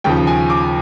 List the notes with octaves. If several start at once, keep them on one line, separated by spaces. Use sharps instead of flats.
D#2 C#3 F3 G5
G#5
D6